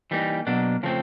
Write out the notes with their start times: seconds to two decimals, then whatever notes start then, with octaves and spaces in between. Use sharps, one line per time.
0.11 E3 G3 A#3 D#4
0.47 B2 F#3 A#3 D4
0.83 C#3 F3 A3 C4